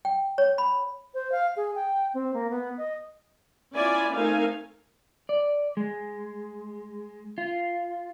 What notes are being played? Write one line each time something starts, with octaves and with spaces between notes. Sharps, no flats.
G5
C#5
B5
C5
F5
G#4
G5
C4
A#3
B3
D#5
C#4 E4 F4 D5 G#5 B5
A3 C4 D#4 A#4 F5 G#5
D5
G#3
F4